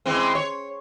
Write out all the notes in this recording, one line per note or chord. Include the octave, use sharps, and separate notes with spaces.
E3 G#3 C4
C#5